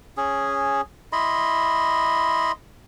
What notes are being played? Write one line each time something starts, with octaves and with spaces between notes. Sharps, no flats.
C#4 G#4
E4 D#5 B5 C6